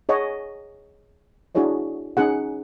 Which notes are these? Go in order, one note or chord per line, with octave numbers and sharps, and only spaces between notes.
G#4 C#5 D#5 F#5 C#6
D4 E4 F#4 G#4 C#5 D#5
C#4 D#4 G#4 F#5